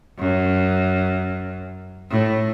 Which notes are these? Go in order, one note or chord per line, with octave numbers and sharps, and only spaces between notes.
F#2
A2